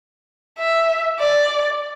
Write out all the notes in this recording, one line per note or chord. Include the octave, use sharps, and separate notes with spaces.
E5
D5